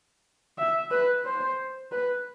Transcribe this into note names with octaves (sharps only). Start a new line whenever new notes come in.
E5
B4
C5
B4